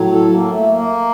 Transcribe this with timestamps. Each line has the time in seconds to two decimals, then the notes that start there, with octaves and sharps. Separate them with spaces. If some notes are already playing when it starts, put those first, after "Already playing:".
Already playing: A2 F#3
0.12 A4
0.31 A#3
0.49 A3
0.68 A#3